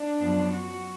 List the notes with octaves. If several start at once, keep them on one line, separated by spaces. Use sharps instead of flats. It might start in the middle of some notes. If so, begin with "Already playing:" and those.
Already playing: D4
F#2 F3 B3
F#4